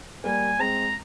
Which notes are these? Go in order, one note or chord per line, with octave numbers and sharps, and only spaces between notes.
G3 A#3 G#5
G#3 C4 A#5